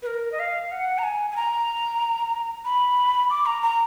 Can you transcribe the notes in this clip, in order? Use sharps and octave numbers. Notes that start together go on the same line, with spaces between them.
B4
A#4
D#5
F5
F#5
A#5
G#5
G#5
A#5
B5
D6
A#5
A#5